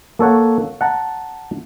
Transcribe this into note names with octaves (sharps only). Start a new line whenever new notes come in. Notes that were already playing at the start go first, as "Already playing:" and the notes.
A#3 A4 C#5 F#5
F#5 A5 A#5